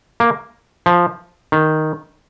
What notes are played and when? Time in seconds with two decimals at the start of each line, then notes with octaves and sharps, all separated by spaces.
0.20 A#3
0.86 F3
1.52 D#3